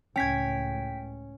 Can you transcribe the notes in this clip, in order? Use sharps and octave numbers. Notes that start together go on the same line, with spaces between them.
C#2 A2 C#4 G5 G#6 B6